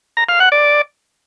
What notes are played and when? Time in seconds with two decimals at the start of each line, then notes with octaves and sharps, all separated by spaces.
0.17 A#5
0.29 F5
0.40 F#5
0.52 D5